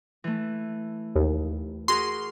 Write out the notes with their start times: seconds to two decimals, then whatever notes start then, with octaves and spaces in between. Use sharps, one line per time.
0.24 E3 A3
1.16 D#2
1.88 F#4 G#4 A#4 C6